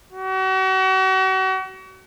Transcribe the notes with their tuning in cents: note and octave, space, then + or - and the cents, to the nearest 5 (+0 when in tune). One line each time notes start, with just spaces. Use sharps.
F#4 +40